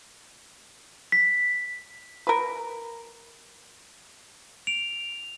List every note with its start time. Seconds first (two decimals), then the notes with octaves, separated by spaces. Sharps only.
1.12 B6
2.27 A#4 B4
4.67 D7 F7